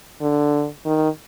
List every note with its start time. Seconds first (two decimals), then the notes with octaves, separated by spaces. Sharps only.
0.21 D3
0.86 D#3